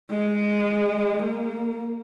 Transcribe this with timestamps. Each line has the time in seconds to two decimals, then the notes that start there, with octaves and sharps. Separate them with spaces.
0.10 G#3
1.23 A#3